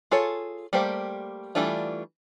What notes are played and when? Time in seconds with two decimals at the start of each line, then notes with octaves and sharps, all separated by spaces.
0.11 F4 G#4 A4 C#5
0.73 G3 A3 A#3 G4 C5
1.55 E3 G3 A3 D4 F4